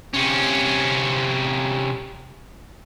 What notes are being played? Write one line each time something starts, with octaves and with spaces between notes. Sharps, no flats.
C3 C#4